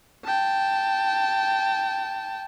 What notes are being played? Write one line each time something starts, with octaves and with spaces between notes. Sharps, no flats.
G5 A5